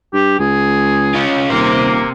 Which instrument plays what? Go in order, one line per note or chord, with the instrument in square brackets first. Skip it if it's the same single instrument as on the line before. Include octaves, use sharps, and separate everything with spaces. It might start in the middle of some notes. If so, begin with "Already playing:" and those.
[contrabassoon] G2 [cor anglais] G4
[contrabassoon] C#2 [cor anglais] G#4
[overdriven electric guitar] C#4 F4
[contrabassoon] D#1 [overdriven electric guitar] C3 C5 [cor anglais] A#3